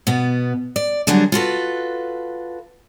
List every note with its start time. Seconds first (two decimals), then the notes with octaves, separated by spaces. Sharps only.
0.07 B2 B3
0.76 D5
1.07 D3 F#3 G3 D4 F#4 G#4
1.32 F4 F#4 A4 B4